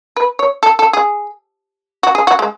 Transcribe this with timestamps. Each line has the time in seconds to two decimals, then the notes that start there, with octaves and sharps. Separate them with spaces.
0.16 B4
0.39 C#5
0.63 A4
0.79 A4
0.93 G#4
2.03 F#4
2.15 G#4
2.27 F#4
2.39 G#3